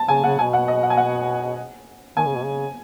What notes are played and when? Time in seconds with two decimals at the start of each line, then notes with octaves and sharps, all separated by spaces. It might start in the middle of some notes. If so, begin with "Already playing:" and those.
Already playing: A5
0.08 C#3 G#5
0.24 C#3 F#5
0.39 B2 G#5
0.53 F#5
0.68 D#5
0.83 F#5
0.90 G#5
0.97 F#5
2.17 D#3 G#5
2.26 C#3
2.36 B2
2.44 C#3